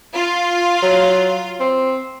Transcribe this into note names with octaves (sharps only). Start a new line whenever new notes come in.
F4
F#3
C4